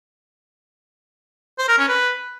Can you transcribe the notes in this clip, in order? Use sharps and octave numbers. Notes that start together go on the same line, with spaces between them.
C5
A#4
C#4
B4